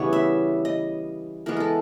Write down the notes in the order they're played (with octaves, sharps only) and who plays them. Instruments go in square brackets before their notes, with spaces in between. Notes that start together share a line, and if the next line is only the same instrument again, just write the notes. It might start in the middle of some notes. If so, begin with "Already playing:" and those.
Already playing: [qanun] C#3 E3 G3 B3 C#5
E5
D#5
E3 G#3 B3 A#4
A4 A#4